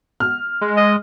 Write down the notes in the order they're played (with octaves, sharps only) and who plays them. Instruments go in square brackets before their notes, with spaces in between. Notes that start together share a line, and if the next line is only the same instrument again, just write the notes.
[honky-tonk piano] F6
[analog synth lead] G#3
[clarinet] D#5